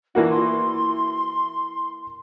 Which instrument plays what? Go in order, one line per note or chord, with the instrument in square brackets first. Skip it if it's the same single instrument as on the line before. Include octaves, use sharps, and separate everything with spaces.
[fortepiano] E3 A#3 F#4 [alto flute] D4
[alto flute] C6